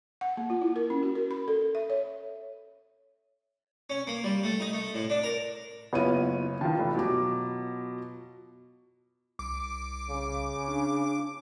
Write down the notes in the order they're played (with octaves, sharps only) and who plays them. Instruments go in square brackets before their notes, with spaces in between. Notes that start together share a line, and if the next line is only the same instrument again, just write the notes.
[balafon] F#5
A#3
F4
E4
A#4
C#4
F#4
A#4
B5
A4
E5
C#5
[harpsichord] C#4
A#3
G3
A3
D#4
A3
A2
D4
A#4
[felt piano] F#1 C#5 D#7 [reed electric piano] B3 E4 F4
[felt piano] D#3 E3 [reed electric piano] F4 A5
[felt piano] F1
B2 F#3 D6
[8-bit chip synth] C2 [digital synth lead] D6
[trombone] C#3
[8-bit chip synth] D4